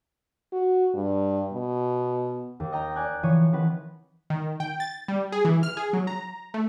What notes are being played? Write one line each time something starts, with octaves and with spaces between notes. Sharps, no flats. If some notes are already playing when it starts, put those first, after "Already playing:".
F#4
G2
B2
D#2
D#5 G5 A#5
D5 G#5 F#6 G6
E3 F3 C#5 D#7
D#3 E3 C4 B4 F#5
D#3
G5
A6
G3
G#4
E3
F6
G#4
F#3
A#5
A3